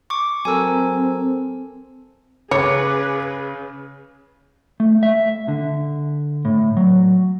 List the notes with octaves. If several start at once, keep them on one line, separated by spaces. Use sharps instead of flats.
C#6 D6
F#3 C4 A4 A#4 G#5 E6
C#3 G#4 B4 C#5 D6 C#7
A3
E5
D3
A2
F#3